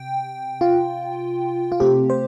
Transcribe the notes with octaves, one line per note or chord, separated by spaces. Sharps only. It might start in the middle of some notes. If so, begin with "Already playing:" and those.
Already playing: C3 G5
F4
F4
C3 A3 C4 G4
C5